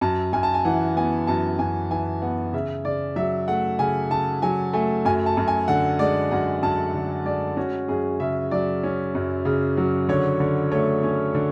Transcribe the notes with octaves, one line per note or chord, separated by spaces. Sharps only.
F#2 A5
F#2 G#5
A5
G#5
E3 F#5
B3 G#5
F#2 A5
F#2 G#5
E3 G#5
B3 F#5
C#3 E5
C#3 D5
F#3 E5
A3 F#5
C#3 G#5
C#3 A5
F#3 G#5
A3 G#5
F#2 G#5
A5
F#2
G#5
D3 F#5
G#3 D5
F#2 F#5
F#2 A5
D3
G#3 D5
C#4 F#4
F#2 G#4
C#3 E5
F#3 D5
C#4
F#2
C#3
F#3
D3 C#5
D3
A3 C#5
C#4
D3